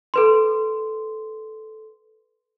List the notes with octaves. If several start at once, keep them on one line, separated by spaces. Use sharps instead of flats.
A4 B4 C6